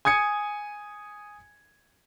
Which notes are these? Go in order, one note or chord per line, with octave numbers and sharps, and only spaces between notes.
G#5 D#6 G#6 C#7